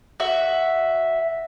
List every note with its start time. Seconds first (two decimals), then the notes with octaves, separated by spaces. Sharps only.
0.20 F#4 E5